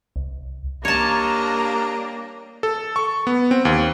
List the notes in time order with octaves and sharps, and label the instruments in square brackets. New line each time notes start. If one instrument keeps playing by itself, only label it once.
[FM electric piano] C2
[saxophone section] G3 D4 [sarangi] A#3 [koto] C#5 A5 [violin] D#5 A#5
[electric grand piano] A4
C#6
B3
C4
D#2